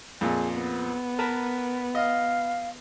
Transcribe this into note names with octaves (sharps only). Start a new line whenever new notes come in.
F2 A#2 G#4
B3
A#4 B4 A5
D#5 F5